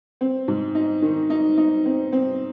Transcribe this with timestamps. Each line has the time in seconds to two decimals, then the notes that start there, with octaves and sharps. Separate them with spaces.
0.21 C4
0.48 G#2
0.75 D#4
1.02 D#3
1.30 D#4
1.58 D#4
1.86 C4
2.12 C4